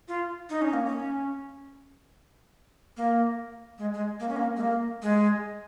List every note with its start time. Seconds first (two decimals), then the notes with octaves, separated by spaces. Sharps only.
0.08 F4
0.50 D#4
0.62 C#4
0.73 A#3
0.85 C#4
2.97 A#3
3.78 G#3
3.94 G#3
4.20 A#3
4.29 C#4
4.36 A#3
4.57 G#3
4.61 A#3
5.02 G#3